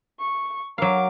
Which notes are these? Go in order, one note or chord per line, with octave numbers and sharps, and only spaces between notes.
C#6
F#3 A#4 F5 D6